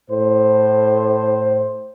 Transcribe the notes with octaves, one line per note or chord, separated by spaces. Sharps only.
A2 C5